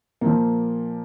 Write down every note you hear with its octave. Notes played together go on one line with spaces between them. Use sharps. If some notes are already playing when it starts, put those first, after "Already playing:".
A#2 F3 A#3